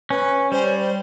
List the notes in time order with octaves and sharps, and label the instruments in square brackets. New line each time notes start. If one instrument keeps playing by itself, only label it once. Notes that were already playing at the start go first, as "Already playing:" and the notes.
[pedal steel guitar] C#4 [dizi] B4
[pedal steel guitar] G3 [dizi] C5
[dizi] C#5
C5